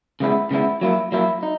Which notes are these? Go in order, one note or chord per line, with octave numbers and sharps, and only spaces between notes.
C#3 G#3 B3 E4
C#3 G#3 B3 E4
F#3 A#3 E4
F#3 A#3 E4
D#4